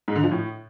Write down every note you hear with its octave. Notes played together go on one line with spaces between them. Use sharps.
G#2
D3
F3
A2